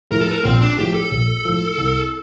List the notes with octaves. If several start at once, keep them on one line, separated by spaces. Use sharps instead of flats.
A2 F3 A#4
A4
A#4
A#1 C4
D4
A2 F3 G4
A4
A#1
A2 F3
C2